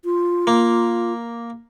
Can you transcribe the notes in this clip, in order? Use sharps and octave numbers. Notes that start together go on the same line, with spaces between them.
F4
A#3